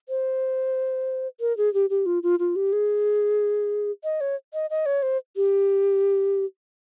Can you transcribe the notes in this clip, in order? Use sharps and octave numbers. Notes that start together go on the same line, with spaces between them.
C5
A#4
G#4
G4
G4
F4
F4
F4
G4
G#4
D#5
C#5
D#5
D#5
C#5
C5
G4